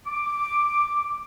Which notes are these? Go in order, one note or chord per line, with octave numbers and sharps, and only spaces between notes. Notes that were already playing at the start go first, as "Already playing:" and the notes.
D6